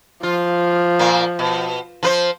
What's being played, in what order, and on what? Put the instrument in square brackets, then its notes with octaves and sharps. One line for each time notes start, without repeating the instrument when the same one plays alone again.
[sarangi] F3 [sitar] F4
[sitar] A#2 A#3
B2
F3 B4 C5